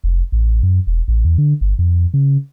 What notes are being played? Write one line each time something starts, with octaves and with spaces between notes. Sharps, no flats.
F1
A1
F#2
E1
A1
E2
D3
G1
F2
C#3